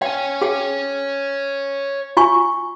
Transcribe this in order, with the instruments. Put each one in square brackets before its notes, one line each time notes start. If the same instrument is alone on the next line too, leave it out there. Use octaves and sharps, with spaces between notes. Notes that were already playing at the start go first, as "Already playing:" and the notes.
[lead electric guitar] C#5 G#5 [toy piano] G5
[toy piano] G#4 G5
F4 G#5 C#6